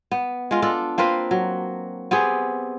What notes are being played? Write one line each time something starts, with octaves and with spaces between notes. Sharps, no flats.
B3
G#3 F4
D4 F4 A4
A#3 C4 F4 B4
F#3
B3 C4 G4 G#4